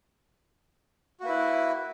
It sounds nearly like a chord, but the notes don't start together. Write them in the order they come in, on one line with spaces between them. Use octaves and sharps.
F#4 A#3 B4 E4